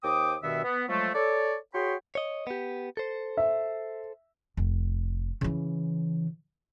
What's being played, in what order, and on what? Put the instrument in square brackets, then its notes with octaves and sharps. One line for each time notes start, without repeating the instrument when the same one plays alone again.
[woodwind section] D#2 C5 G5 D6 D#6
G2 B2 D#3 B3 E5
B3
F3 F#3 G#3 A3
A4 C#5 D5
F#4 G#4 C#5 G5 B5 C6
[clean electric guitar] C#5 D#5
B3 G4
A4 C5
[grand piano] E5
[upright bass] F1
C#3 E3